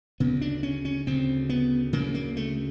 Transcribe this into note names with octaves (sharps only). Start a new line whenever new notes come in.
D2 C#3 B3
D4
C#4
C#4
D2 C#3 C4
B3
D2 C#3 A#3
A#3
A3